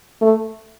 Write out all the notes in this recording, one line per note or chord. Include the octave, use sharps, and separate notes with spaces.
A3